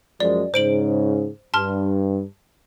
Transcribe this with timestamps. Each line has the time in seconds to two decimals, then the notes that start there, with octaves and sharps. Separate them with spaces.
0.20 F#2 F3 G#3 D5
0.54 G#2 C#3 C5 D7 F#7
1.54 G2 A5 C6 F6